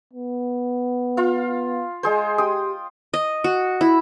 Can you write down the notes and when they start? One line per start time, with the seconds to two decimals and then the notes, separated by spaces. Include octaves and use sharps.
0.13 B3
1.17 F4 F5
2.03 G#3 G#4 C5
2.38 G4 G5 D#6
3.14 D#5
3.44 F#4
3.81 E4